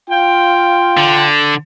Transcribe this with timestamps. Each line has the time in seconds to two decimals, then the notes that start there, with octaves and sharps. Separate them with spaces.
0.10 F4 F5 G5
0.97 D3